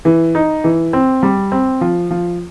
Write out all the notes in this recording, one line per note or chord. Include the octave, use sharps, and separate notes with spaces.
E3
D#4
E3
C4
G3
C4
F3
F3